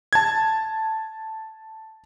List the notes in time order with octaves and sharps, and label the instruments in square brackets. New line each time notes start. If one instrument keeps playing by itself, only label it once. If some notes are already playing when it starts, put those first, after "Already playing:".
[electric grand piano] A5 G#6